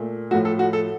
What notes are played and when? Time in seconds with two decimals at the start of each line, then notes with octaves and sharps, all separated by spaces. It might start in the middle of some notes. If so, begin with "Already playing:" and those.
Already playing: A#2 A3
0.31 A2 F3 A3 F#4
0.45 A4
0.59 F#4
0.73 A4